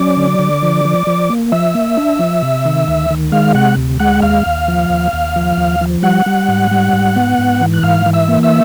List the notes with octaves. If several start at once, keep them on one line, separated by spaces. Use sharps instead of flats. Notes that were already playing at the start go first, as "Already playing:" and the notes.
Already playing: F#3 C#4 D5 D6
D3
D3
F3
F3
F3
A#3
F3 E5 E6
A#3
D4
F3
C3
D#3
D2
D#3
G#3 F5 F6
C3 F#5 F#6
D2
G#3 F#5 F#6
D#2 F5 F6
D#2
F3
D#2
D#2
F3
D#2
F3
G3 F#5 F#6
G3
G#2
G3
G#2
B3
G#2
E3
F#6
G#2 F5 F6
E3
E5 E6
A#3
E5 E6